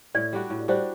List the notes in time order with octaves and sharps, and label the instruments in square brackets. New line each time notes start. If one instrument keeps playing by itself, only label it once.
[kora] A2 [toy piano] D5
[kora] G3 D4 F#4
A2
[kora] G3 D4 F#4 [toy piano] C5